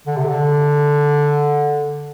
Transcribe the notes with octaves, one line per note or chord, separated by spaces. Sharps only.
D3
C3
D3